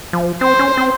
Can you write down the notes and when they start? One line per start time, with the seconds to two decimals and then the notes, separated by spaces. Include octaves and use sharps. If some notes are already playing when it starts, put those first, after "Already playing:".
0.13 F3
0.41 C4 C5
0.59 C#4
0.77 C4